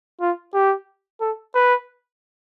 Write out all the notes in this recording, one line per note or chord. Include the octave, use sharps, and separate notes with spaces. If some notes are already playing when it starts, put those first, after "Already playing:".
F4
G4
A4
B4